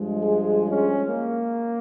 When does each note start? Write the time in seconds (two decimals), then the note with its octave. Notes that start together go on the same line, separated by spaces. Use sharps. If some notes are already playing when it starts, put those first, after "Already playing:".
Already playing: G2 F3 G#3
0.23 G#4
0.66 C#4
1.08 A#3